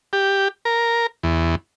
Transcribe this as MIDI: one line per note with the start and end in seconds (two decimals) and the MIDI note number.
0.13 0.48 67
0.65 1.07 70
1.23 1.55 40